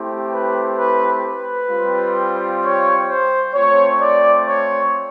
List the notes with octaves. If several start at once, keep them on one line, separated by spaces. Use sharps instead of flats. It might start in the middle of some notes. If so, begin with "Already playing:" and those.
Already playing: A3 C4 E4 G4
B4
B4
B4
G3 C4 F4
C#5
C5
A3 C4 F4 C#5
D5
C#5